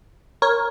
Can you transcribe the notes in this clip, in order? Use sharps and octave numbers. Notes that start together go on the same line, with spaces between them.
A#4 C#5